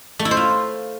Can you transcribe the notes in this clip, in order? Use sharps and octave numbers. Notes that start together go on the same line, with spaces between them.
A3
E4
C5
F4